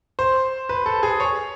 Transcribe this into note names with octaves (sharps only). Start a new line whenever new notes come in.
C5
B4
A4
G#4
C#5